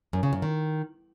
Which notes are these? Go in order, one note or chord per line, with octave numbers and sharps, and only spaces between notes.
F#2
C#3
F#2
D#3